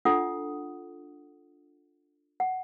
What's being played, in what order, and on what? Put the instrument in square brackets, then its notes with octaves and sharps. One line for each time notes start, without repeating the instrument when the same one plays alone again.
[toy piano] D4 F4 A4 F#5 D#6
F#5